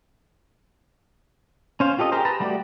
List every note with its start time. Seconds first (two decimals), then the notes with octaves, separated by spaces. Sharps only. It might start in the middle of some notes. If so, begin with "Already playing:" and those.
1.80 C#4 C5 F5
1.98 F4 G4 A4 D#5
2.12 G4 G#4 A#4 C5
2.25 B4 A5 A#5
2.40 G3 A3 F#4 G4 D5